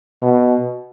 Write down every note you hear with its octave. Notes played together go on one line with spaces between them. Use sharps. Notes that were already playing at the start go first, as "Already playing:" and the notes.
B2